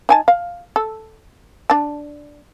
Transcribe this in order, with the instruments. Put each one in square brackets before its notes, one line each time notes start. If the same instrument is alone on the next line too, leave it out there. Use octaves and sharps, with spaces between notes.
[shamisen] D#4 G#5 A5
F5
A4
D4 A5